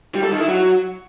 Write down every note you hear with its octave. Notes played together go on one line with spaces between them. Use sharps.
G3
A4
D#3
E4
F#3